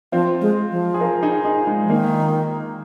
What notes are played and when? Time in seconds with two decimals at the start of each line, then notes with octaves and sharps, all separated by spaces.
0.12 F3 C4 F4
0.41 G#3
0.72 F3
0.94 G#4
1.00 F4 A#4
1.23 D#4 G#4
1.45 D#4 G#4
1.67 G#3
1.83 F3
1.89 D#3 A#3